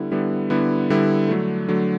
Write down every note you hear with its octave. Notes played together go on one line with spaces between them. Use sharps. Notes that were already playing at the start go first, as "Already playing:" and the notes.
Already playing: D3 G3 B3 E4
D3 G3 B3 E4
D3 G3 B3 E4
D3 G3 B3 E4
D3 F#3 A3
D3 F#3 A3